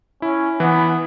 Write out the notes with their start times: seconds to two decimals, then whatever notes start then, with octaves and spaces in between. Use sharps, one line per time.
0.22 C#4 E4
0.60 E3 B3